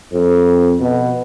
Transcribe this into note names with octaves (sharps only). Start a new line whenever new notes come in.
F2
B2